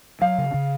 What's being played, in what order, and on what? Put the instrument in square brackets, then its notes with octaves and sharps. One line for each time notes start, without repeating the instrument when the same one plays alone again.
[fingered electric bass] F#3 [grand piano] F5
[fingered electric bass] C#3
C#3